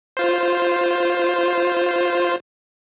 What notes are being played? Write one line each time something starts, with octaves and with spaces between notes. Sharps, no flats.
F4 C5